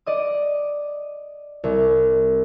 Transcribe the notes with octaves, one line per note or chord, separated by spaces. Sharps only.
D5 D#5 D#6
C2